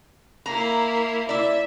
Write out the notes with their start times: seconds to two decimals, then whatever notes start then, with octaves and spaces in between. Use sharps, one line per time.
0.46 A#3 E4 A#5
1.29 E4 D5 E5